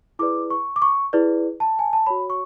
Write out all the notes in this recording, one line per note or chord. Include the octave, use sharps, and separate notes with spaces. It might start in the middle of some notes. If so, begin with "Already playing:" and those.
E4 G#4 B4 D5 D6
C#6
D6
C#6
E4 G#4 B4 D5
A5
G#5
A5
F#4 C#5 B5
C#6